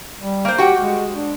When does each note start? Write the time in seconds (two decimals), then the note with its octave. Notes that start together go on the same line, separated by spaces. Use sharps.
0.18 G3
0.45 A#3 C5
0.58 F#4 G4 F#5 G5
0.79 G#3
1.13 D4